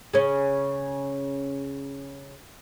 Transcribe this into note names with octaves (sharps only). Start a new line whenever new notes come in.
C#3 C#4